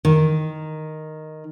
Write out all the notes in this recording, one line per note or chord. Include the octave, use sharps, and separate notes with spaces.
D#3